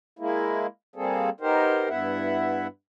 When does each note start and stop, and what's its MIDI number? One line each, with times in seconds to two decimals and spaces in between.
0.19 0.67 56
0.19 0.67 58
0.19 0.67 64
0.96 1.30 55
0.96 1.30 58
0.96 1.30 60
0.96 1.30 68
0.96 1.30 69
1.40 1.89 59
1.40 1.89 63
1.40 1.89 67
1.40 1.89 70
1.40 1.89 72
1.89 2.67 43
1.89 2.67 59
1.89 2.67 64
1.89 2.67 76
1.89 2.67 78